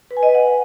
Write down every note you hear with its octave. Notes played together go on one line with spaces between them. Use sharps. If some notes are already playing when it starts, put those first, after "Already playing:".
B4
G#5
D#5
B4
F#5